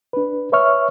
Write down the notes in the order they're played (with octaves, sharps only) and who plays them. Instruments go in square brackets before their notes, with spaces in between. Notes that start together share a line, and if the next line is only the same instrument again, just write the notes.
[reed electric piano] D4 B4
B4 C#5 E5 C#6 F6